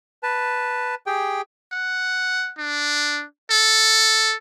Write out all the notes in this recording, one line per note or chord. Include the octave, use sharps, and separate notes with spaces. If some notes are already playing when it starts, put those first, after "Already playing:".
B4 A5
G4 G#4 G5
F#5
D4
A4